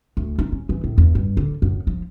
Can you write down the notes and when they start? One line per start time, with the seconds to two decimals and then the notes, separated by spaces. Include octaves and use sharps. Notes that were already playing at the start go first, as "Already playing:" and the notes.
0.17 D2
0.39 D#4
0.52 C#4
0.69 E3
0.84 A2
0.98 E2
1.15 G2
1.37 D3
1.62 F#2
1.87 F3